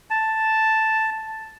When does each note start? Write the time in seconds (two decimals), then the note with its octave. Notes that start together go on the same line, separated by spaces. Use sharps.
0.10 A5